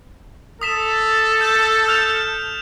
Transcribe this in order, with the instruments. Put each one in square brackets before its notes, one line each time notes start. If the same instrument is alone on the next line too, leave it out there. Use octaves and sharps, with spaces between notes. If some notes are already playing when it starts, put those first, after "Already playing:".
[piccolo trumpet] A4 [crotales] D#6 B6 E7
[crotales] G6 E7
F6 G6 F7